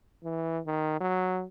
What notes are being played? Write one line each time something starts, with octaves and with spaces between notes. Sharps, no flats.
E3
D#3
F#3